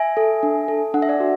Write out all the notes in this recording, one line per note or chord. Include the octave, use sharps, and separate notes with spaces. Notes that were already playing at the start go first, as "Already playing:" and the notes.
Already playing: E5 G#5
A4
D4
A4
D4 F#5
E5
D5 F#5
F#4